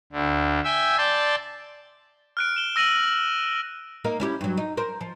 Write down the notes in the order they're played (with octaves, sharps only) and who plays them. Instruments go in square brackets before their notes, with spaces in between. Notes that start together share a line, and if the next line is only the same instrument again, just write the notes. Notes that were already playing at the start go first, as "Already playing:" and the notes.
[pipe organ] D2 D3
E5 G5 G#5 E6
D5 G5 A5 C6
[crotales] F6 F#6 D7
E7 G7
E6 A#6 D#7 F#7
[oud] A#3 D#4 A#4
C#4 E4 G4
G2 F#3
D#4
A#4 C5
F3